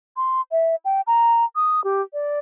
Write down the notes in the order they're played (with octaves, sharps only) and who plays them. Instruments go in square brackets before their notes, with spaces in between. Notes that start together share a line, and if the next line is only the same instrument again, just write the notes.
[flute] C6
E5
G5
A#5
D#6
G4
D5